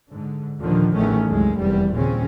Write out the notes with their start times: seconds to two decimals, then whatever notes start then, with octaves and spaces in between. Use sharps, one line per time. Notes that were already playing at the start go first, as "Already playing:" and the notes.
0.11 G#2 D3
0.61 D#2 A#2 D3 D#3 F3
0.95 A1 E2 D#3 A3 C#4
1.27 C2 F#2 G#3
1.60 F1 E2 G3
1.93 D#2 A#2 C#3 C4 C#4